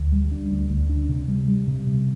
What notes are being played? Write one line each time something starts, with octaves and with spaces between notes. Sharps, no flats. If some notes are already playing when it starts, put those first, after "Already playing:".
Already playing: D2
G3
D4
D2
D2
D4
C3
G3
G3
C3
C3